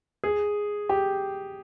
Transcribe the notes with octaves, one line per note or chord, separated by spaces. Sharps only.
G#4
G4